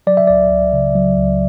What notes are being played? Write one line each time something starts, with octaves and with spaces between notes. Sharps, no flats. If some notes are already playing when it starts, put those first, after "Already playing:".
F#3 D5
E5
C#2 D5
C#2
C#3
F#3
C#2